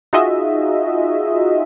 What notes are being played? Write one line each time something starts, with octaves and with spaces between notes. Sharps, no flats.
D#4 F4 F#4 G#4 D#5 E5